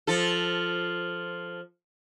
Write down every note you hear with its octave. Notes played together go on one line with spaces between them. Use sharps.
F3 A4